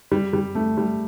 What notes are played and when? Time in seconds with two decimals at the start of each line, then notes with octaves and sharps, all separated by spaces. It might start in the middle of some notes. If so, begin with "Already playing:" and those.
0.12 G3
0.33 G3
0.55 A3
0.78 G3